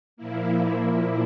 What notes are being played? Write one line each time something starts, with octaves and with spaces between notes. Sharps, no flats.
A#2 F3 A#3 E4